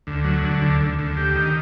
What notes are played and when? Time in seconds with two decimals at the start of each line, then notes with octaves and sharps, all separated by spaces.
0.07 D2
0.24 F#3
0.43 D3
0.62 D2
0.81 D2
0.99 D2
1.17 G4
1.36 D#3